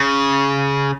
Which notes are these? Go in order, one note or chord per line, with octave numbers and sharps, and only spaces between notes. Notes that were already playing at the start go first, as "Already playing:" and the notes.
Already playing: C#3